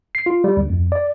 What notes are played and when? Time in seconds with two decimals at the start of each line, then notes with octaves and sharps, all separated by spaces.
0.15 C7
0.26 F4
0.44 G3
0.57 D2
0.70 F2
0.92 D5